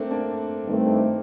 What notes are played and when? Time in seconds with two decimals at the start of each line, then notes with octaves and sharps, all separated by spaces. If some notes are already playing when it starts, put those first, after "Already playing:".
Already playing: A3 A#3 C4 D4
0.11 A#3 D4
0.65 G2 D#3 A3 C4